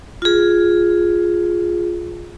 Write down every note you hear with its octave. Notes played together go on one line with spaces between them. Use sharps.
F4 G#4